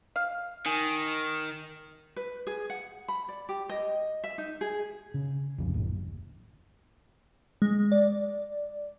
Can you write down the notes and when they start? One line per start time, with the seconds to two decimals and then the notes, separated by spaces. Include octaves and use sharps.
0.16 F5
0.66 D#3 G#5
2.16 B4
2.47 G#4
2.70 F#5
3.08 B5
3.29 D5
3.49 G4
3.69 D#5
4.24 E5
4.38 D#4
4.61 G#4
5.14 C#3
5.58 D#1 C2 F2 C#3
5.74 D#1 G#1 F#2 A2
7.62 G#3
7.92 D5